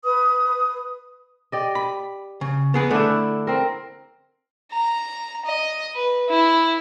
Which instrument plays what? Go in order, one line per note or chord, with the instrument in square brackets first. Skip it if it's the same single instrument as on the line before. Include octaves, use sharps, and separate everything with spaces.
[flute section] B4 D#6
[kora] G4 D5 D#5
[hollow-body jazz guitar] B5
C#3
B3 G#4 B4
[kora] D3 D4 E4 [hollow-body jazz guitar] A3
[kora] C4 A#4
[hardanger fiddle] A#5
D#5
B4
E4